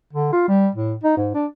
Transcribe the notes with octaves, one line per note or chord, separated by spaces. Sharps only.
D3
F4
G3
A2
D#4
G#2
D4